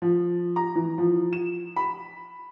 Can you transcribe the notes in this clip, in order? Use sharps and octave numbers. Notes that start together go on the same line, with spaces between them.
F3
A#5
E3
F3
E7
B5